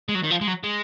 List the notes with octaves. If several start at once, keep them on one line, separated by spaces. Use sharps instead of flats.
G#3
F#3
D#3
F3
G#3
F#3
G#3